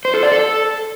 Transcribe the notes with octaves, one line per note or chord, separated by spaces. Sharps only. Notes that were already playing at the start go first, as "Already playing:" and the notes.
C5
A4
D5
A4